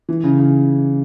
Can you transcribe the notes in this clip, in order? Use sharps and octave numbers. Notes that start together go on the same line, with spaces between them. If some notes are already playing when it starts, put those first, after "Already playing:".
E3
C#3
C#3